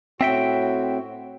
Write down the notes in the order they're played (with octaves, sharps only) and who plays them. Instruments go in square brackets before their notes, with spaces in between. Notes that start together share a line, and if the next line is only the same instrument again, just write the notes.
[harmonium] A2 F#4 [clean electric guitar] C4 E5 G5